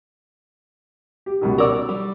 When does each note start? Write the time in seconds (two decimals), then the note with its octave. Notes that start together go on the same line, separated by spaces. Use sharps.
1.26 G4
1.41 C#2 B2 D#3
1.58 A#4 D5 C#6 D6 E6
1.89 G3